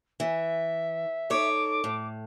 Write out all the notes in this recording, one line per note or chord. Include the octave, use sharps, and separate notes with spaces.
E3 E5
D#4 A4 C#5 D6
A2